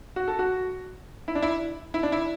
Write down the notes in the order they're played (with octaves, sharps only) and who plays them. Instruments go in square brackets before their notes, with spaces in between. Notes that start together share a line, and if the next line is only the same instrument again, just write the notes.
[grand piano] F#4
A4
F#4
E4
D4
E4
E4
D4
E4